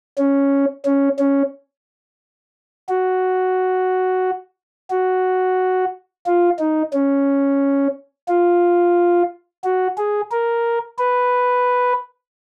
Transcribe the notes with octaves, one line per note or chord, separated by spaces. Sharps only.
C#4
C#4
C#4
F#4
F#4
F4
D#4
C#4
F4
F#4
G#4
A#4
B4